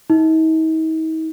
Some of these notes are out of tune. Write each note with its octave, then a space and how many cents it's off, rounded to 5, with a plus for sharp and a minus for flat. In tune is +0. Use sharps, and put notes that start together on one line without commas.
D#4 +45